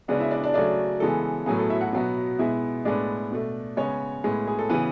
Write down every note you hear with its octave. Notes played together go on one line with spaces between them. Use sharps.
C#3 G#3 B3 D4 D5
E4 E5
D4 D5
D4 D5
C#3 F#3 A3 D4 D5
C#3 E3 G#3 B3 A4
A2 F#3 B3 G#4
A4
E4 E5
F#4 F#5
B2 F#3 B3
B2 G#3 B3 E4 E5
A2 G#3 B3 D4 D5
B2 A3
C#3 G#3 B3 C#4 C#5
A2 G#3 B3
G#4
A4
C#3 E3 B3 B4